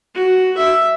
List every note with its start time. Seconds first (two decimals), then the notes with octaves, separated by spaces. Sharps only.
0.15 F#4
0.57 E5